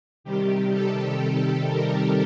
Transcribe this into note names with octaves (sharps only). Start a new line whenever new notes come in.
C3 D#3 G3 G4
A4
A#4